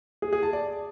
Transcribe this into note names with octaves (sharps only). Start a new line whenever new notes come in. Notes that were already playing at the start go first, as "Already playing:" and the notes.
G#4
G#4
A5
D5